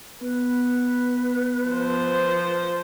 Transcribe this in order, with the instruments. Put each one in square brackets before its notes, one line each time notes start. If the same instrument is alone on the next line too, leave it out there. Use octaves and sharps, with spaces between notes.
[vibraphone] B3 [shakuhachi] B4
[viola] F3 C5